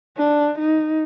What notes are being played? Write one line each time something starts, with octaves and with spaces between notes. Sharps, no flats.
D4
D#4